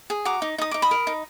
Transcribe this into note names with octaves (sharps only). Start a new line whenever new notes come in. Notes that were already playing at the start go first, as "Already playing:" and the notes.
G#4
F#4 A#5 D6
D#4
D#4 D#6
D#4 D6
B5 D#6
A#4
D#4